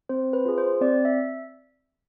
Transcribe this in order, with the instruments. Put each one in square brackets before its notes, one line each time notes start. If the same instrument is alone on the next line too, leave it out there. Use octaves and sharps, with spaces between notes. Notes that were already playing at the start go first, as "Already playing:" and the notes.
[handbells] C4 C5
B4
F4 G#4
C5
C4 D5
E5